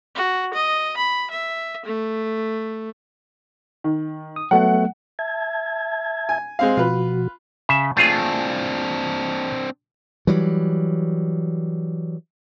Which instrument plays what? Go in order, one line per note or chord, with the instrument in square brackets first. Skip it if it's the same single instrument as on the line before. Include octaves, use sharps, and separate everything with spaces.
[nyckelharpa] F#4
D#5
B5
E5
A3
[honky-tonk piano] D#3
[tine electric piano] D#6
[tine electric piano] F#3 A3 B3 [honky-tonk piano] F#5
[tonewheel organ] E5 A5 G#6
[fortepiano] G#5
G#3 C4 F5
[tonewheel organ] B2 F3 F#4 [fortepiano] F4 B4
[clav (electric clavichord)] C#3 E5
[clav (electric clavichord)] A3 F4 G#4 [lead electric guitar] C4 D4
[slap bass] E3 F#3 G3